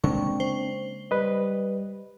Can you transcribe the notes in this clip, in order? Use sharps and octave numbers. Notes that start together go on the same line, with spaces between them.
C#3 G#3 A#3 C4 D4 C#6
C5
G3 B4 D#5